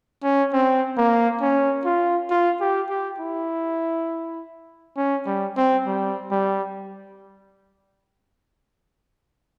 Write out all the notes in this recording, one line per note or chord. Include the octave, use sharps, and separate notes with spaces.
C#4
C4
A#3
C#4
F4
F4
G4
G4
E4
C#4
G3
C4
G3
G3